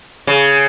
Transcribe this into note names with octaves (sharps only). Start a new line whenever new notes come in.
C#3